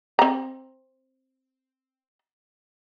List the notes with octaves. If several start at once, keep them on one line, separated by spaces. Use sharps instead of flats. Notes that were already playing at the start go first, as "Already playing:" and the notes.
C4 A#5